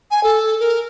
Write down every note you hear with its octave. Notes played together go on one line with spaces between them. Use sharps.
G#5
A4
A#4